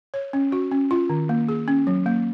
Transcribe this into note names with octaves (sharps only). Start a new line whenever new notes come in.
C#5
C#4
F#4
C#4
F4
D#3
A#3
G#4
C#4
F#3
A#3